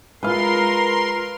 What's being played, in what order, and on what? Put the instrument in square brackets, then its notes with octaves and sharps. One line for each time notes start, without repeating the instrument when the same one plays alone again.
[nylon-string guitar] G#3 F4 [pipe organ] A#4 C6 [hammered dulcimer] B4 F5